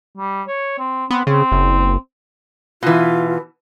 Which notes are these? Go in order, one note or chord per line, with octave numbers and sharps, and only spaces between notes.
G3
C#5
C4
B3 C4
C#3 C4
F#1
B2 E3 F4